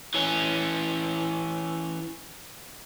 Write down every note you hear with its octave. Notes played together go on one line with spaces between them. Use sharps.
E3 C#4